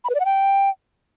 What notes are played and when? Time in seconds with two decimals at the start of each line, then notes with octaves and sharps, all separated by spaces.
0.04 B5
0.10 B4
0.15 D5
0.20 F#5
0.25 G5